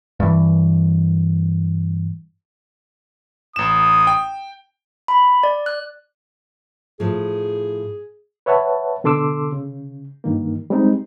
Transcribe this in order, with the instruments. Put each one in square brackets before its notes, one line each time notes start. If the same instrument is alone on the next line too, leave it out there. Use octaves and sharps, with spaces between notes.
[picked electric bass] G2 E3
[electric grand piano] A1 E7 [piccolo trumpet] D#6
[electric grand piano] G5
[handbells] B5
D5
F#6
[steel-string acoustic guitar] A2 F3 [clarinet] G#4
[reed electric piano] B4 C#5 E5 F#5 A5
B2 D3 A4 C6 D6 E6
C#3
G2 D#3 A#3
G3 G#3 C4 D#4